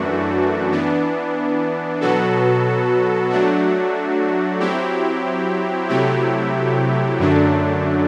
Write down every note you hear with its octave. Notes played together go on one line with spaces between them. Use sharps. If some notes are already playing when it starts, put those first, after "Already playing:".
Already playing: F#2 E3 A3 D4 F#4
E3 B3 D4
B2 F#3 B3 F#4 A4
F#3 A3 D4 F#4
F#3 C4 E4 G4
C3 F#3 A3 E4 G4
F#2 D3 F#3 A3 D4